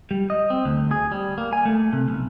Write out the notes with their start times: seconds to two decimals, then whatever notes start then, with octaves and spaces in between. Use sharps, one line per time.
0.11 G3
0.30 D#5
0.50 C4
0.65 D2
0.91 G#4
1.12 G3
1.38 A#3
1.53 G#5
1.65 A3
1.93 C3
2.08 B1